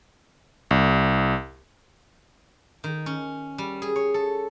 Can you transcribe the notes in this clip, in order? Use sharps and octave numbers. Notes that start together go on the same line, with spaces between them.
C2
D#3
C#4
G3
G#4
C#5
A4